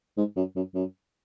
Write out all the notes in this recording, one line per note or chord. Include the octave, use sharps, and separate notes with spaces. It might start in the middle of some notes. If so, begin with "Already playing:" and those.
G#2
F#2
F#2
F#2